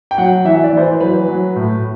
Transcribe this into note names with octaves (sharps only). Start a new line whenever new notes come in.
G5
F#3 F#5
E3 E5
E5
D5
E3 C5
B4
F#3 B4
F#3
A2